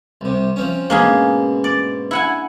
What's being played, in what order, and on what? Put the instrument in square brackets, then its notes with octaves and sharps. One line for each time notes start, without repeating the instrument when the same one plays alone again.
[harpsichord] C2 C3
F3 C4 C#4
[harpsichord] G#2 B2 [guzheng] A#3 C#4 G#4
[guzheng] D5
E4 F#5 G#5